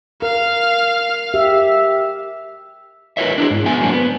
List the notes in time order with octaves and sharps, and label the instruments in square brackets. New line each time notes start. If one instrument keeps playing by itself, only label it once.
[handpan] A#4 [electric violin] F5
[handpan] G4 [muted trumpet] E5
[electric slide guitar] F4 A#4 B4 C#5 D#5 E5
D4 E4 G#4
G#2
B3 F4 E5 G#5
F#3 A#3 C4 D4
B3